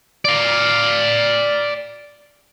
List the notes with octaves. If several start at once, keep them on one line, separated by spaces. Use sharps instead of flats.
D5 F5